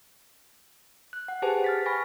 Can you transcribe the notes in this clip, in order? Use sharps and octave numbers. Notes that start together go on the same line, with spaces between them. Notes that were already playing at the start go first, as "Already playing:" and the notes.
F#6
F#5
G4 G#4 B4 C5 G#5 A5
F6 A6 B6
G#5 B5 C#6 A6 A#6